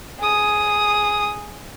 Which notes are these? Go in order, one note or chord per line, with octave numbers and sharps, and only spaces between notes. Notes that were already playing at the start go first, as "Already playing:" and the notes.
G#4 D#6